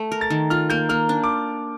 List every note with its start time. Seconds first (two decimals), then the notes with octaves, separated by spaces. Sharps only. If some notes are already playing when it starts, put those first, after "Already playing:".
Already playing: A3
0.12 A#4
0.21 A6
0.30 D#3
0.50 F4 F6
0.70 A#3 G6
0.89 A#3 F6
1.09 D4
1.24 D6